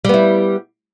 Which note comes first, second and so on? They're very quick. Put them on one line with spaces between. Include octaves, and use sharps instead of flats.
G3 B3 E4